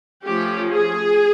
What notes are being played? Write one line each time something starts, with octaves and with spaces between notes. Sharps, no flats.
F3 A3 C#4 G4
G#4